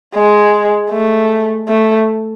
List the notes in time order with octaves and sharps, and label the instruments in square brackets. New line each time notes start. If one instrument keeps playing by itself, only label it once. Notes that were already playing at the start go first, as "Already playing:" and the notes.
[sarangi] G#3
A3
A3